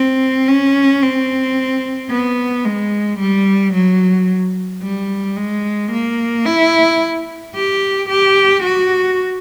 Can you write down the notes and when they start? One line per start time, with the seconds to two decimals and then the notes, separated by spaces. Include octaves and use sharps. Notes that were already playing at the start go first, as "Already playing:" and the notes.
Already playing: C4
0.48 C#4
1.02 C4
2.11 B3
2.65 G#3
3.19 G3
3.74 F#3
4.83 G3
5.37 G#3
5.92 A#3
6.46 E4
7.55 G4
8.09 G4
8.63 F#4